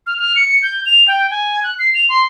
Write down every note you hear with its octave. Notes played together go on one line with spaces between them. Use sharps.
F6
F6
C#7
C#7
G6
F7
G5
G#5
F#6
C7
F7
C6